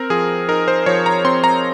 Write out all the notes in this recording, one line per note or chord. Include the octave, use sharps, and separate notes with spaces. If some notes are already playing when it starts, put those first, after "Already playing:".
Already playing: C4 A#4
F3 G#4
D#4 A#4
C5
F3 C#5
A#5
C4 C6
A#5